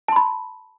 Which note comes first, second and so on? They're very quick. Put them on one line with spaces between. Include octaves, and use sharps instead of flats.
A5 C6 B5